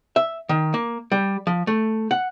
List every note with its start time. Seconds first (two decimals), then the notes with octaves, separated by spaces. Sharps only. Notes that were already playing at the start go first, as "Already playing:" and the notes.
0.16 E5
0.49 D#3
0.74 A#3
1.12 G3
1.47 F3
1.67 A3
2.11 F#5